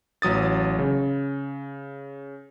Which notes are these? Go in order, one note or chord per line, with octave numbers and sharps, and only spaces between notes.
A1 F#3 D#6 A6
C#3